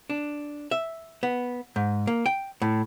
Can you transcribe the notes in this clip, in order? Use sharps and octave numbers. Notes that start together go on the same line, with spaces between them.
D4
E5
B3
G#2
A#3
G5
A2